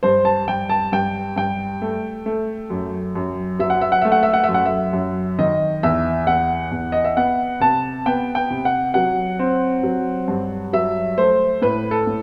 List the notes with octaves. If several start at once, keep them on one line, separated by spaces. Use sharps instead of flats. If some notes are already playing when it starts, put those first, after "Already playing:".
G2 C5
A5
G2 G5
A5
G2 G5
G2 G5
A3
A3
F#2
F#2
F#3 E5
F#5
E5
F#5
A3 E5
F#5
E5
F#5
E5
F#2
F#5
E5
F#2
D#3 D#5
E2 E5
E2 F#5
E2
D#5
E5
B3 F#5
C3 A5
B3 G5
G5
C3
F#5
F#3 F#5
C4
F#3
G2
F#3 E5
A3 C5
A2 B4
A4
A2